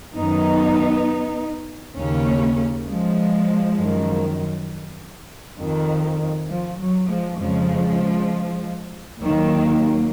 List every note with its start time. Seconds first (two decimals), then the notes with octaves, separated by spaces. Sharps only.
0.16 F#2 D#3 B3 D#4
1.96 D#2 C#3 A#3 C#4
2.88 F3 G#3
3.77 F#2 D#3
5.59 F2 D#3
6.49 F3
6.79 F#3
7.09 F3 G#3
7.39 F2 C#3 F3 G#3
9.20 D#2 D#3 F#3 A#3